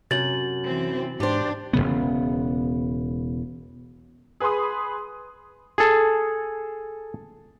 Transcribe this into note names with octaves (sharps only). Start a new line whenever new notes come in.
F#2 C3 A6 F#7
E3 C4
G#2 D4 G4 C5
E1 F2 C#3 B3
G#4 B4 B5 C6 D#6
G#4 A4